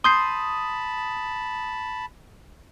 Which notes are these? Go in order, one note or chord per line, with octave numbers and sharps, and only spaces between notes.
A5 B5 C6 D#6 G6 C7